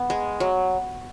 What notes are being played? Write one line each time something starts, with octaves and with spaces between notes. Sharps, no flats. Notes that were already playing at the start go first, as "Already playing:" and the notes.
Already playing: B3
G#3
F#3